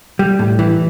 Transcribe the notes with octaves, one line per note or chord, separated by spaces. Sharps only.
G3
A2
E3